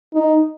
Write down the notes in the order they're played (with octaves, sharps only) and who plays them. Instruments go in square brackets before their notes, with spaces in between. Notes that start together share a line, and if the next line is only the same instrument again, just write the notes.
[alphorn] D#4